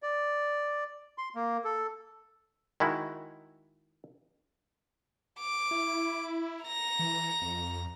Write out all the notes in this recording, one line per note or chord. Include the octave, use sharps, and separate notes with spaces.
D5
C6
A#3
A4
D#3 G#3 E4 F#4
D6
E4
A#5 A#6
E3
F2